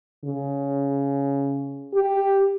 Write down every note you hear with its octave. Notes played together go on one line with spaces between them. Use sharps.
C#3
G4